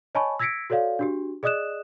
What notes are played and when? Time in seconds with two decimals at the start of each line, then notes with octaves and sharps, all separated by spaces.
0.15 C#5 D#5 G#5 A5 B5 C#6
0.39 E6 G#6 A#6 B6 C#7 D7
0.70 F#4 A4 C#5 D5 F5
0.99 D4 F#4 G4
1.43 G#4 D5 D#5 D#6 F#6 E7